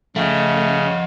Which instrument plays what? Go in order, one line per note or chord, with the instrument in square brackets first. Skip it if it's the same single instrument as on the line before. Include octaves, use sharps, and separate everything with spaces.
[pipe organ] C#3 [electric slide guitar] F3 D#5 [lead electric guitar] A3 [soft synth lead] F#5